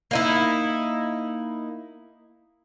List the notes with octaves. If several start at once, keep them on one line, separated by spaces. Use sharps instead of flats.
A#3 D#4 E4